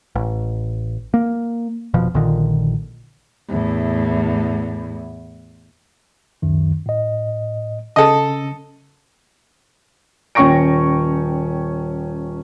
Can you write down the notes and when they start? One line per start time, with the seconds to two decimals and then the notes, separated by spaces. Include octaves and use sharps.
0.15 A1
1.14 A#3
1.94 F1 B2 F3
2.14 A#1 A#2 D3 D#3
3.49 E2 A2
6.42 C#2 F#2 D#3
6.86 A2 D#5
7.96 C#3 C#4 A4 D#5 A5
10.35 D#1 C#4 G5 C#6 A#6 D7